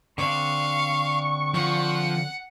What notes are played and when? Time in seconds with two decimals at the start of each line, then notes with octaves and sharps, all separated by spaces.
0.18 D3 C4 D4 F5 C#6
1.54 F3 F#5